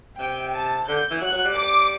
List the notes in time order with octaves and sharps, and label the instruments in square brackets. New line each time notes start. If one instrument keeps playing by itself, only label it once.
[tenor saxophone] C3 [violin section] G5
[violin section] A5
[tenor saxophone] D3 [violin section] G6
[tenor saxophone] E3
[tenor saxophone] F#3 [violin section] F#6
[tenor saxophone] F#3
G3
[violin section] D6